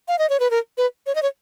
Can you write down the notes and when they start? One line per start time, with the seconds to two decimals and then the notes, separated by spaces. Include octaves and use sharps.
0.08 F5
0.19 D#5
0.29 C#5
0.40 B4
0.51 A#4
0.78 B4
1.06 C#5
1.15 D#5
1.22 C#5